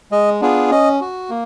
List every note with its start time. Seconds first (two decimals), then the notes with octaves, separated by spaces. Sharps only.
0.11 G#3 D#5
0.41 B3 D4 F4 G#4
0.71 C#4 D#5
1.01 F#4
1.30 A#3